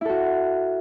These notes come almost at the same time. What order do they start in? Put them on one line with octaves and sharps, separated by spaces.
E4 A4 F#4